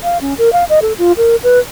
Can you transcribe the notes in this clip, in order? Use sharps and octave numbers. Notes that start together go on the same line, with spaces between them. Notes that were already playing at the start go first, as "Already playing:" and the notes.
F5
C#4
A#4
F5
D#5
A4
F4
A#4
B4